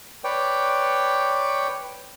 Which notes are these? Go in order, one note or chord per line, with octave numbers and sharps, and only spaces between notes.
B4 C#5 D5 G5